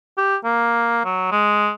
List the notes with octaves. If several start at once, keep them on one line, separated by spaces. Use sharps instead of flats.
G4
A#3
F#3
G#3